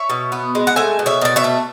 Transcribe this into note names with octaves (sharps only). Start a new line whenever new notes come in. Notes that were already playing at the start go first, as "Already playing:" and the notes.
Already playing: C#5 E5
B2
B3
G#3
F#5
A3 E5 G#5
B2
C#5 E5
B2 D5
C#5 E5
A3